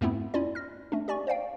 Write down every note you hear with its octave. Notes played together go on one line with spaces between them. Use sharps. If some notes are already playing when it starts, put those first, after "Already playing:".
F2 G#2 A3 B3 C4 E4
C#4 E4 F4 D5
F6 A#6
A3 C#4 D4
G4 D5 G#5 C#6
C5 D5 F5 G5